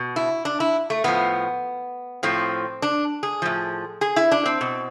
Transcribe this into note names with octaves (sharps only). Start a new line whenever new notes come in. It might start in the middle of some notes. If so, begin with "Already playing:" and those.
Already playing: B2
E4
D4
E4
A3
A2 F3 B3
A2 F3 C4
D4
G#4
A2 F3
G#4
E4
D4
C4
B2